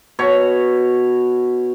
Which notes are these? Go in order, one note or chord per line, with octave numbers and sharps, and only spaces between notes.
B2 C#5